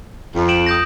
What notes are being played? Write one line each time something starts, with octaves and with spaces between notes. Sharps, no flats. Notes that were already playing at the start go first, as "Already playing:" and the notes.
F2
D7 E7 F#7
D#6 G6 A#6